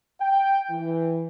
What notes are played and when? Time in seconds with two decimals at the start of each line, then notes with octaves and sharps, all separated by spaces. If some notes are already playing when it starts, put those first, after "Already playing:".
0.20 G5
0.70 E3